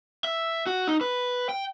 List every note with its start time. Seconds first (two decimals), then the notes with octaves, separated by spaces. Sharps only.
0.25 E5
0.67 F#4
0.88 D#4
1.01 B4
1.49 G5